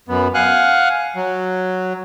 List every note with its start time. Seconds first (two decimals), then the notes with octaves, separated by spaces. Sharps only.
0.08 F#2 B3
0.35 F5 F#5 G#5 F6 F#6
1.16 F#3